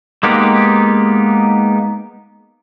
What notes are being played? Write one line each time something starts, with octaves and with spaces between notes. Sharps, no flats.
G#3 A#3 B3 D#4 G4